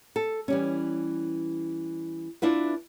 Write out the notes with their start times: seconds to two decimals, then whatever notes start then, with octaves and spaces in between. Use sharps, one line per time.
0.16 A4
0.48 E3 G3 C#4
2.42 D4 E4 F4 B4